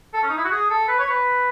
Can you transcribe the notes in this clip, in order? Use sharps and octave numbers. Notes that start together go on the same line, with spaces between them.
A4
C#4
D#4
E4
F#4
G#4
A4
B4
C#5
B4